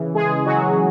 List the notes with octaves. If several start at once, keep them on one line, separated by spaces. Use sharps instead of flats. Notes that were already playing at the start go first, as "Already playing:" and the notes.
Already playing: C#3 E3
G#3 G#4
F#3 F#4